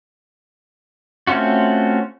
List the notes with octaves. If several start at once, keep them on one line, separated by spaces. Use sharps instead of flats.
A3 C4 C#4 F4 F#4